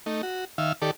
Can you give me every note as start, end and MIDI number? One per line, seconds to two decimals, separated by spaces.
0.06 0.22 57
0.06 0.22 63
0.23 0.45 66
0.58 0.73 51
0.58 0.73 76
0.58 0.73 77
0.82 0.91 51
0.82 0.91 67
0.82 0.91 69
0.82 0.91 74